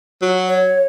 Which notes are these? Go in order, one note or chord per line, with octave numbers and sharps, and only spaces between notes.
F#3
C#5